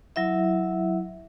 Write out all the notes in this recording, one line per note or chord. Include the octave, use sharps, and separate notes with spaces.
F#3 E4 E5